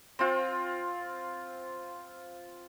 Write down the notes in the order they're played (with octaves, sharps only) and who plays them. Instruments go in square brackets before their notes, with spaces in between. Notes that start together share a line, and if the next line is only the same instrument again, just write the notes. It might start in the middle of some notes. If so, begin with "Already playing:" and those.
[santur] C4 F4